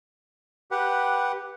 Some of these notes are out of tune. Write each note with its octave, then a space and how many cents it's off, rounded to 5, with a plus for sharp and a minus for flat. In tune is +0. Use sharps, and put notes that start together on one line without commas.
G4 +0 B4 -10 F#5 +0